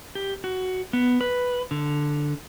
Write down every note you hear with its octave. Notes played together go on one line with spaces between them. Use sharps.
G4
F#4
B3
B4
D3